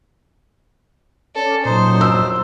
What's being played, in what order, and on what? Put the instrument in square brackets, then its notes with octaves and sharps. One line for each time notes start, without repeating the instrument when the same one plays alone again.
[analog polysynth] C#4 D5 [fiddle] A4
[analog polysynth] A#2 F#3 [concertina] D#4 [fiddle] C5
[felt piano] E6